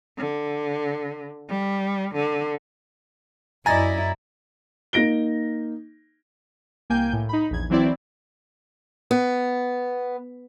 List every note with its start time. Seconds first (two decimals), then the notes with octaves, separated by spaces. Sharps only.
0.18 D3
1.49 G3
2.15 D3
3.66 F#2 E4 D5 D#5 G#5 A#5 A6
4.93 A#3 D#4 A#6 D7 G7
6.90 C2 A#3 G5 G#5 G6
7.13 A2
7.29 D#4 B5
7.51 A#1 E2 G#6
7.70 E3 F#3 C4 E4 D5
9.11 B3